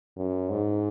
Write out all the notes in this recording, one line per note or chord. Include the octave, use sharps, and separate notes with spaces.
F#2
G#2